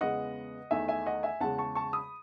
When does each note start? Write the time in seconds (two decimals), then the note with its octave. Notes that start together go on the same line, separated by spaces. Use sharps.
0.01 E2 C#3 G#3 B3 D#5 F#5
0.71 E2 D#3 A3 D#4 E5 G#5
0.88 E5 G#5
1.06 D#5 F#5
1.23 E5 G#5
1.40 E2 C#3 G#3 F#5 A5
1.58 A5 C#6
1.75 A5 C#6
1.93 B5 D#6